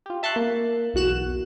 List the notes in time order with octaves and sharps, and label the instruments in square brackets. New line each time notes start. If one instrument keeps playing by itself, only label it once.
[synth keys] F4 G4
E5 A5 C6 C#6 F#6
A#3
B1 E2 F#4 F#6 E7